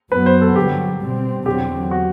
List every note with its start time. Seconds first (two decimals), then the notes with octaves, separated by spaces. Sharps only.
0.11 F#2 F#3 B3 B4
0.26 C5
0.41 A4
0.56 G2 D3 F#3 G4
1.01 B2 G3 C4
1.46 E2 D3 F#3 C4 G4
1.91 F#4